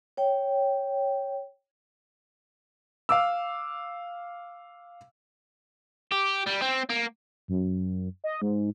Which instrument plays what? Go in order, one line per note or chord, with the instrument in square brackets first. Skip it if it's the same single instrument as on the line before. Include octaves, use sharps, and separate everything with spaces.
[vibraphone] C#5 G5
[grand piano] F5 D6 E6
[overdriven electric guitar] G4
G3
C4
A#3
[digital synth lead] F#2
D#5
G#2